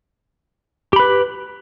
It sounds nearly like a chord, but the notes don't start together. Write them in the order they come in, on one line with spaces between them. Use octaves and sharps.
G4 B5 B4